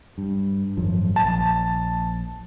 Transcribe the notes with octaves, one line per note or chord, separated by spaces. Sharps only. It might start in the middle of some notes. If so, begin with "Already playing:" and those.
G2
G#1 F#2 F3
A#1 A5